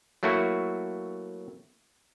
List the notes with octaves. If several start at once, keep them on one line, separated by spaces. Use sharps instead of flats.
F#3 A3 A#3 E4 F#4